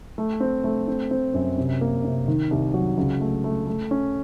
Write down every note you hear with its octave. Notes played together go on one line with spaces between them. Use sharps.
A3
C4
A3
C4
C4
F#2
C3
A#3
C3
D#3
C2
F#3
C#2
A3
A3
A3
C#4